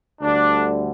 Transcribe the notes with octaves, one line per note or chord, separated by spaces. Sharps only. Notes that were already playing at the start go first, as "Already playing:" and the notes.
D2 D3 G3 D4